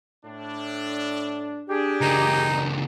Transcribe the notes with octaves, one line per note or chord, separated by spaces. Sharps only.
A2 D4
D4 G4 G#4
C#2 A#3 D#4
D4